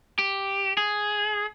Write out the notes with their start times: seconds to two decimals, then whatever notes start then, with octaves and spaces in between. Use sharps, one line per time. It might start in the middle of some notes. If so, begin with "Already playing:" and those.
0.19 G4
0.77 G#4